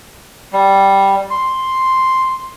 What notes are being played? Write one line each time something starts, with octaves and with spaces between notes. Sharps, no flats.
G3
C6